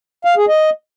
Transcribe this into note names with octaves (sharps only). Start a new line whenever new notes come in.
F5
G#4
D#5